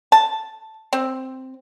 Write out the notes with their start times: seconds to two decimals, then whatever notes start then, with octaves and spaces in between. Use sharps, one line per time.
0.12 A5
0.93 C4